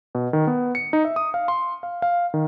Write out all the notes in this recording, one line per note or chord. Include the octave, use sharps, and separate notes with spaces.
B2
D#3
B3
C#7
D#4
E5
D#6
F5
C6
F5
F5
D#3